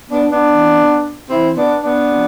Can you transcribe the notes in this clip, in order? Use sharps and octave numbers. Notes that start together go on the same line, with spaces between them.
B3 D4
B3 D4
C3 E3
C3 E3 C4 E4
B3 D4
B3 D4
C3 F3